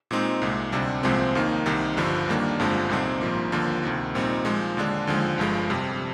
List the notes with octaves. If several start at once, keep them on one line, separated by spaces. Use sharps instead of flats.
A#2 G#3 C4 D#4
C2 A#2 G#3
D2 C3 G3 D4
C2 A#2 F3 G#3 C4
D#2 D#3 A#3 D#4
C2 C3 D#3 G3
G1 G2 D3 F3
D#2 D#3 G3 A#3 D4
G1 F2 D3 F3 G#3
C2 A#2 G3 C4 D#4
A#1 G#2 F3 A#3
D#2 D3 F3 A#3
D2 C3 D#3
A#1 A#2 G3 C4 D#4
A#2 F3 G#3
D#2 D3 G#3 D4
D#2 D3 F3 G#3
G1 G2 F3 G#3
F2 C3 G3